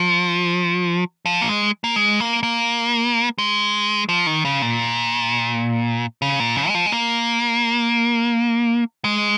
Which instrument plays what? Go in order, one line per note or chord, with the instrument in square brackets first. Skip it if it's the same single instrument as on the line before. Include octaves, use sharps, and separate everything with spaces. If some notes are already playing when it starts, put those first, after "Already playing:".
Already playing: [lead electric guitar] F3
F3
A#3
G#3
A#3
G#3
A#3
A#3
G#3
F3
D#3
C#3
A#2
C#3
A#2
C#3
G#3
F3
G#3
A#3
G#3